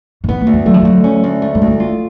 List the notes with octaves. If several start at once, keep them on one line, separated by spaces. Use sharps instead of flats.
B2
C#3 B3
A3
D2
G#3
F#3 A3
F3
D2 F#3
C#4
D2
A3
G#3
D2
A3
F4